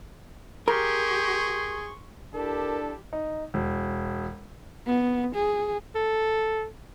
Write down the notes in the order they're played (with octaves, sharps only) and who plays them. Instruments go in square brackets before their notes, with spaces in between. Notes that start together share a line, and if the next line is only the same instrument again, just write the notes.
[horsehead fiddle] G4 [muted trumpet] G#4 [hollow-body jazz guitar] A#4 [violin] C6 C#6
[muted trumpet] D4 [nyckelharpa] E4 G4 [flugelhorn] A4 [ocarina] A#4
[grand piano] D#4
E1
[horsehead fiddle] B3
G#4
[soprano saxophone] A4